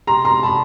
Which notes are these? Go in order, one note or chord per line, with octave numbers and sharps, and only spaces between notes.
C3 A#5 C6
A#5 C6
C3 A5 B5